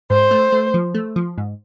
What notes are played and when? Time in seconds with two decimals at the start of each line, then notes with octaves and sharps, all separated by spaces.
0.10 G#2 C5
0.31 A3
0.52 A3
0.74 F3
0.94 A3
1.16 F3
1.38 G#2